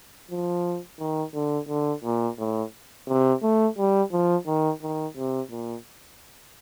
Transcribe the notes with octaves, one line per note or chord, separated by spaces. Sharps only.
F3
D#3
D3
D3
A#2
A2
C3
A3
G3
F3
D#3
D#3
C3
A#2